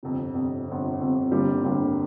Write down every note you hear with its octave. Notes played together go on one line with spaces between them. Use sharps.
G1 F2 C3
G1 F2 C3
G1 F2 C3
G1 F2 C3
G1 F2 D3 G3 A#3
G1 F2 D3 G3 A#3